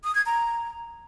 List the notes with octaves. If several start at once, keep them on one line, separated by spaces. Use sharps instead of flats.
D#6
G#6
A#5